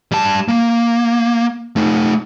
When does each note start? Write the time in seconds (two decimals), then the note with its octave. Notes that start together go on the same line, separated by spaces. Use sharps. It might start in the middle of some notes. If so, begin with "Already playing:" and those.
0.12 G3 A5
0.48 A#3
1.76 A3 D#4